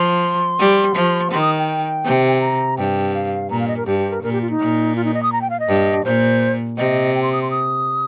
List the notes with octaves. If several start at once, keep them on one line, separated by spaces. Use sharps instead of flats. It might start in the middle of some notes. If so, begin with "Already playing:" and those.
Already playing: F3 C6
G3
F3
D#3 C6
D#6
G5
C3
A#5
G2 G5
F5
A#2 A#5
F5
D#5
A#4
G2 G4
G4
A#4
A#2 A#4
G4
F4
D#4
A#2
F4
D#4
D#5
D#6
A#5
G5
F5
D#5
G2
A#2 C5
C3 D#5
G5
C6
D#6
C6
D#6